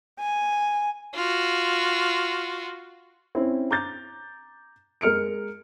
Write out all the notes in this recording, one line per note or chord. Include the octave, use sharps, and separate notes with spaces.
G#5
F4 F#4
C4 C#4 E4
A#5 D6 G6 A6
G#3 A#4 F6 C#7 D7